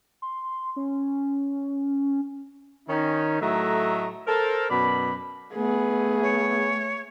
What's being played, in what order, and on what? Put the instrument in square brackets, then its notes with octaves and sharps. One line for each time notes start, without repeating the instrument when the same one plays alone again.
[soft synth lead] C6
C#4
[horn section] D#3 C#4 D#4
A2 F#3 A3 D#5 E5 A#5
A4 A#4 C5
F#2 B2 D5 B5
[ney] A3 [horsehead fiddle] B3 G#4
[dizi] C#5